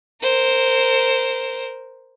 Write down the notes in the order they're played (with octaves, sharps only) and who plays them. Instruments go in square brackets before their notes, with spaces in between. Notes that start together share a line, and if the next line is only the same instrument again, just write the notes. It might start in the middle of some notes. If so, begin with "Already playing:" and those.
[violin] A#4 C5